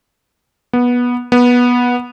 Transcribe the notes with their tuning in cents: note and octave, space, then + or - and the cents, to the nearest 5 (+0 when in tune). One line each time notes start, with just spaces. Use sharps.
B3 -15
B3 -15